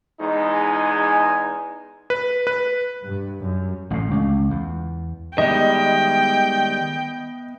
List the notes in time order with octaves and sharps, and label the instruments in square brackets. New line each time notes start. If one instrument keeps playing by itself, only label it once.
[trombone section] E2 G#3 D#4
[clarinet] G#5
[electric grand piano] B4
B4
[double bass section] G2
F#2
[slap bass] A1 A2
C#2
E2
[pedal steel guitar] D#3 G3 G#3 [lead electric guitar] B3 E5 [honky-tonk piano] D#5 [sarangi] G5